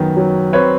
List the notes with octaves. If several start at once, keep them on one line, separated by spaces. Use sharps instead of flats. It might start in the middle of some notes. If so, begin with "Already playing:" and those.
Already playing: F#2 D#3 B3
F#3
C4 B4 C#5